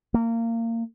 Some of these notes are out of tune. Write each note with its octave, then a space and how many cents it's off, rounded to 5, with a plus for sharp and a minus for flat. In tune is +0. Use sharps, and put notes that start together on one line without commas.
A#3 -25